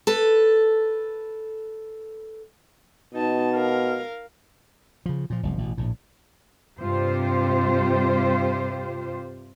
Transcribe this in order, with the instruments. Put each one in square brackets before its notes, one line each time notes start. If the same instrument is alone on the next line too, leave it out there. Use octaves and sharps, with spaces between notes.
[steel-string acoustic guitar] A4 B4
[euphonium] B2 [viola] D#4 A5
[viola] A#4 F5
[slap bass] C#3 F3
A#2 F3
F#1 C2 F3
A1 B2
A#1 A2
[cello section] G2 C3 F4 G4 C5